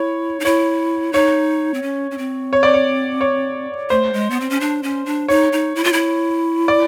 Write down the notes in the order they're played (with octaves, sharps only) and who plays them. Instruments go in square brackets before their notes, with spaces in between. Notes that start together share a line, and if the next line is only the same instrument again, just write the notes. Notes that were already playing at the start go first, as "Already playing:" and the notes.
Already playing: [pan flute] E4 [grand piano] C#5
[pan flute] D#4
[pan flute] E4 [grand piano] C#5
[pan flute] D#4 [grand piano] C#5
[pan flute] C4
C#4
C#4
C4
[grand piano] C#5
D5
C#5
C#5
[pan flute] A3 [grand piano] C5
[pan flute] G#3
B3
C4
C#4
D4
C#4
D4
[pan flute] D#4 [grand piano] C#5
[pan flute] D#4
E4
F4
E4
[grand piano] D5